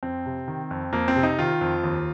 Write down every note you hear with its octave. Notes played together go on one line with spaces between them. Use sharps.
F2 C4
C3
D#3
F2
F2 A#3
C4
C3
D#4
D#3 F4
F2
D#2